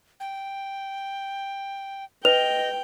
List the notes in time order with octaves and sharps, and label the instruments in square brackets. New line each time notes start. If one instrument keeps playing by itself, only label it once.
[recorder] G5
[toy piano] B4 [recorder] D#5 [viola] G5 [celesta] F7